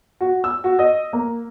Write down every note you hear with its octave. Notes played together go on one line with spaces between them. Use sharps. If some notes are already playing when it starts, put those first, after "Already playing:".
F#4
E6
F#4
D#5
A#3